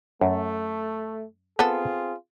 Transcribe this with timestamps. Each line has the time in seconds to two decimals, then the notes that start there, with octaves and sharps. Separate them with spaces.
0.21 F#2 A3
1.59 B3 C4 F4 G#4 A4